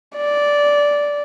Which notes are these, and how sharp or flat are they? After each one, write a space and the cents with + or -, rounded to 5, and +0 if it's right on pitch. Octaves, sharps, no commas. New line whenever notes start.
D5 -10